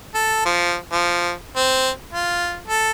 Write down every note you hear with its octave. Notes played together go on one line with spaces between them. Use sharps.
A4
F3
F3
C4
F4
A4